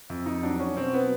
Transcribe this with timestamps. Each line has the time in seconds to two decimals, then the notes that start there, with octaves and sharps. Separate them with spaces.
0.10 F2
0.26 F2 D#4
0.43 F#3 D4
0.59 F#3 C#4
0.77 B2 C4
0.93 F#3 B3